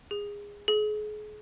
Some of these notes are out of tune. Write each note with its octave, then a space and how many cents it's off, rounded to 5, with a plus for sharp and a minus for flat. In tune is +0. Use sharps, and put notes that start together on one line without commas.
G#4 -20
G#4 +35